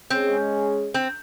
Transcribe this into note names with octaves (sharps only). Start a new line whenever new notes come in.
G#3 C4 C#4 G#4
C4